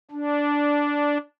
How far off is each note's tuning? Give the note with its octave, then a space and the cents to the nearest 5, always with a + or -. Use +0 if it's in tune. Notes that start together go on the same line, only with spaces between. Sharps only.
D4 -10